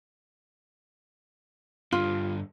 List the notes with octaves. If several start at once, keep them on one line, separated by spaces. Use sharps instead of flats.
G2 D3 F4